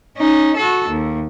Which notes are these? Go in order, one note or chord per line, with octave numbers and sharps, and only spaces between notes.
C#4 D#4
F#4 A4
D#2